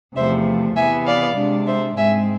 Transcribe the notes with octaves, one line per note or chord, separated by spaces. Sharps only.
E2 C3 F3 A3 C5 E5
C3 E3 B3 E5 G#5
D5 F5
C3 G#3 D4
C5 E5
G#2 G#3 C4 E5 G#5